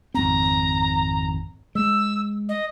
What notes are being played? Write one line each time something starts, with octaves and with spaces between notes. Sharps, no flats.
G#1 F2 C4 A#5
G#3 E6
D#5